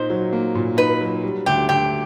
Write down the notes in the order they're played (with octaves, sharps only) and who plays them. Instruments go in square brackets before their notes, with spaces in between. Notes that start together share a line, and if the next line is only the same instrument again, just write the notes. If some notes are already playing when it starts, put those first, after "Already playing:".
Already playing: [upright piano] A#2 A#3 D#4 [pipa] C5
[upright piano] F#3
A#3
A#2
[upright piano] D#4 [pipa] B4
[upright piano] F#3
G3
[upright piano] D2 [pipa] G4
[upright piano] D2 [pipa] G4